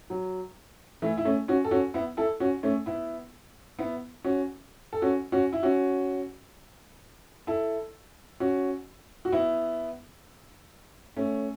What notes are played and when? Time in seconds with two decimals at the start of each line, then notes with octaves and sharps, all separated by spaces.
0.10 F#3
1.02 E3 A3
1.17 E4
1.25 A3 C#4
1.48 C#4 F#4
1.64 A4
1.71 C#4 F#4
1.94 B3 E4
2.17 E4 A4
2.40 C#4 F#4
2.63 A3 C#4
2.86 B3 E4
3.78 B3 E4
4.24 C#4 F#4
4.93 A4
5.02 C#4 F#4
5.32 C#4 F#4
5.53 E4
5.63 C#4 F#4
7.47 E4 A4
8.40 C#4 F#4
9.25 F#4
9.32 B3 E4
11.17 A3 C#4